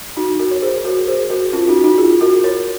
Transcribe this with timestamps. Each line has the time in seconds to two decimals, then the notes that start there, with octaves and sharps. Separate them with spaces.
0.17 D#4 F#4
0.39 F#4 A#4
0.51 C#5
0.62 G#4 C5
0.84 F#4 A#4
1.08 G#4 C5
1.30 F#4 A#4
1.53 C#4 F4
1.68 D#4 F#4
1.84 D#4 F#4
1.98 F4 G#4
2.21 F#4 A#4
2.44 A#4 C#5